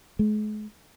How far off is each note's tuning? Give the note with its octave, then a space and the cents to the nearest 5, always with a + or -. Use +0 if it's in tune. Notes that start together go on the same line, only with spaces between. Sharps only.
G#3 +40